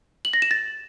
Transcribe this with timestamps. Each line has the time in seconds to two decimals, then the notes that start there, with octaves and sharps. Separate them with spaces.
0.25 F#7
0.33 A#6
0.42 E7
0.51 A6